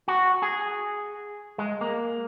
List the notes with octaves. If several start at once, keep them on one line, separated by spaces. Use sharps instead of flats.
F#4
G#4
G#3
A#3